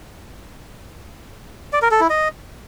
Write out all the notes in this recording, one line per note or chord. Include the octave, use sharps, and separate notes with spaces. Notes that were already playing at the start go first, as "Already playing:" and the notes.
D5
A#4
A4
E4
D#5